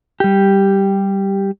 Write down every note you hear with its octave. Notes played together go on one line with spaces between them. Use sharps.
G3 G4